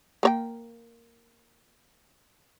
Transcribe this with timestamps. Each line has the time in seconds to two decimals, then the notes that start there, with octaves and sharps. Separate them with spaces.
0.23 A#3 C#5 G5